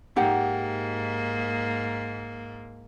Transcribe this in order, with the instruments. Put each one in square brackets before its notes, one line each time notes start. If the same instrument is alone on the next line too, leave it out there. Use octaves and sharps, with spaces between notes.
[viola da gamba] G#2 A#3 [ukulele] D#4 G4 F#5